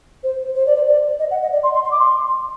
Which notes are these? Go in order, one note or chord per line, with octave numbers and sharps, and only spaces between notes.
C5
C5
D5
C5
D5
D#5
F#5
D#5
D5
C6
C6
C6
D6
C6